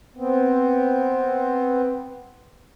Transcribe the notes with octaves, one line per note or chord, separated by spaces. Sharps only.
B3 C4